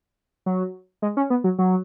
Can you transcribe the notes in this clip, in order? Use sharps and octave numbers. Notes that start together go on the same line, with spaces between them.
F#3
G#3
C#4
B3
F#3
F#3